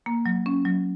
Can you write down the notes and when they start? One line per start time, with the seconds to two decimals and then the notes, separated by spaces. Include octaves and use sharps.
0.06 A#3
0.26 F#3
0.46 C#4
0.65 F#3